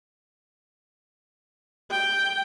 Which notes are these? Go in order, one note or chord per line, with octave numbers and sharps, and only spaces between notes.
G5